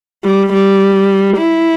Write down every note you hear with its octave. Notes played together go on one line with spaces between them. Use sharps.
G3
G3
E4